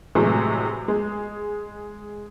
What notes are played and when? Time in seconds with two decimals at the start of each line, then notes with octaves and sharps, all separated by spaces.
0.15 A2 C3 E3 F#3 G#3 A3
0.88 G#3